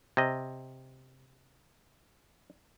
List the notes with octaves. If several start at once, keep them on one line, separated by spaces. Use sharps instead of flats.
C3 D#5